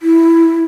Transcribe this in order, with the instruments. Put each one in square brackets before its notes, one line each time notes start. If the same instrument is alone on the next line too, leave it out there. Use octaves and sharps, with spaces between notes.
[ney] E4